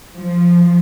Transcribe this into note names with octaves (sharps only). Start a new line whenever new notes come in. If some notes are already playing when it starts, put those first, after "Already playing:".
F3